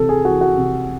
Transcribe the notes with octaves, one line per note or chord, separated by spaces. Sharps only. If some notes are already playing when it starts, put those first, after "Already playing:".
Already playing: C3 E3 A4
G#4
E3 F#4
F#4
C3